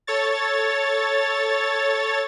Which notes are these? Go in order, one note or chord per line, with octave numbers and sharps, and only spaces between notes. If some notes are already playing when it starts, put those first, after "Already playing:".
A4 C#5 A6